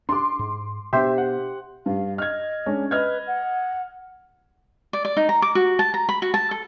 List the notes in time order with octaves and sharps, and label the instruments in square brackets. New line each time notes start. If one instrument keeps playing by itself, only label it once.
[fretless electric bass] D4 [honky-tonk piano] C6 D6
[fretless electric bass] G#2
[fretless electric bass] B2 B3 D4 [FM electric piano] G4 C5 [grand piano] E5
[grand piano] F#5
[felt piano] G2 [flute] F5
[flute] D#5 [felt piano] F6 G#6
[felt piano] G#3 C#4 D4
[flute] B4 [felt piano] D#5 F6 G#6
[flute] F#5
[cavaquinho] D5
D5
D#4
A#5
D6
F#4
A5
A#5
B5
F#4
A5
A4